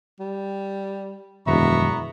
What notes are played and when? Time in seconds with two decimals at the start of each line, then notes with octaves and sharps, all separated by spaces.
0.20 G3
1.47 E1 F#2 D#3 F3 B3 E5 A#5 C#6